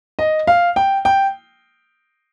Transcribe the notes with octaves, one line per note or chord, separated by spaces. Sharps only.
D#5
F5
G5
G5